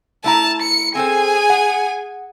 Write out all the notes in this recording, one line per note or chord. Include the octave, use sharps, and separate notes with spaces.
A3 E4 A5 A#5
C#7
C4 G#4 A4 C5 G#5
F#5